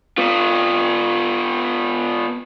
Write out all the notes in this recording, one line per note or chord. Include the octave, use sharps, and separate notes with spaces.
B3 F4